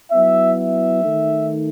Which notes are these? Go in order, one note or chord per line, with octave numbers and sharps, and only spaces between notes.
F#3 B3 E4 E5
E5
D#3 A3 D#4